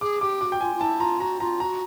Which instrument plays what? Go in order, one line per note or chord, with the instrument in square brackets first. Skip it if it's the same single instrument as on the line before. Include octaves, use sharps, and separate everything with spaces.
[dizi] G#4 [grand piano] D6
[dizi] G4 [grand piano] D6
[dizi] F#4 [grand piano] D6
[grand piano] G5
[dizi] F4 [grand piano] G#5
[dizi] F4
[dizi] E4 [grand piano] A5
[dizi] F4 [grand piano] A#5
[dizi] F#4 [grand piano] A#5
[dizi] F4 [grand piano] A#5
[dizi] F#4 [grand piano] A#5